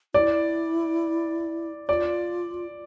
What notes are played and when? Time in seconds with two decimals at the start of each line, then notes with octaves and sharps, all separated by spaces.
0.14 E4 D5
1.88 F4 D5